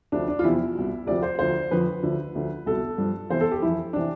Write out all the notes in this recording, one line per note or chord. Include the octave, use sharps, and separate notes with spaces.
D2 C3 F3 D4
D4
F4
E2 C3 F3 E4
C2 B2
D2 C3 F3 D5
C5
D2 D3 F3 C5
F2 D3 F3 B4
D2 D3 F3
D2 D3 F3
C2 B2 A4
G2 F3
E2 C3 E3 C5
A4
G4
F2 E3 E4
C3 E3 D4